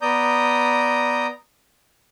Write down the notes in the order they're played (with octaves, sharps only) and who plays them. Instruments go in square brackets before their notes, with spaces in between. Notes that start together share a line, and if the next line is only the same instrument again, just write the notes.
[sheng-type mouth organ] B3 D5 A#5 D#6 G6